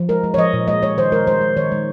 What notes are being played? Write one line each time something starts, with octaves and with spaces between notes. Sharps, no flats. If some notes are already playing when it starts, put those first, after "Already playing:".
Already playing: F3
G#3 A#4
G#3
C#5
F3 D#5
A#2
G#3 D#5
G#3 C#5
D#3 C5
G#3 A#4
G#3 C5
G#3
D#3 C#5
G#3